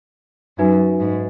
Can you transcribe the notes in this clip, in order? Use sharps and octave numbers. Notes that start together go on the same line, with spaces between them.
F#2 D#4 F#4 B4 E5 G#5
G#2